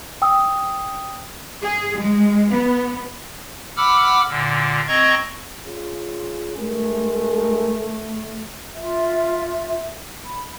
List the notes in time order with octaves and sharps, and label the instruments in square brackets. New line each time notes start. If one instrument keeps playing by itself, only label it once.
[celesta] G5 D#6 E6
[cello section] G#4
G#3
B3
[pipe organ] F#5 B5 D6 E6 F6
A#2 D3
C4 D#5 A#5 C#6 G#6
[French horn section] C#4 F4 G#4
[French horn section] G2 G#3 A#4 [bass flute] A3
[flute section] F4 E5
B5